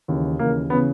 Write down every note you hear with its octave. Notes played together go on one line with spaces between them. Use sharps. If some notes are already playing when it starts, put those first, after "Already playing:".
D#2 C#3 E3
D#2 C#3 E3 A#3
C#3 E3 B3